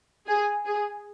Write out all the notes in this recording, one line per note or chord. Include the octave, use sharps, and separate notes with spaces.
G#4
G#4